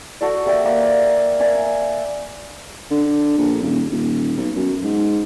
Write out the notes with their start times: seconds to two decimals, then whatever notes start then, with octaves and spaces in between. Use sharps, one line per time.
0.21 F#4 A4 D5
0.46 A#3 G4 D5 E5
0.65 A#3 D5 A#5
1.40 A#4 D5 E5 G#5
2.91 D3
3.37 A#1
3.62 D#1
3.91 D#1
4.37 B1
4.56 F#2
4.84 G#2